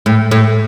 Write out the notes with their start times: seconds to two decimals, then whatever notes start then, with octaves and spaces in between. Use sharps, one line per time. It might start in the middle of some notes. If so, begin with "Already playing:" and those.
0.06 A2
0.31 A2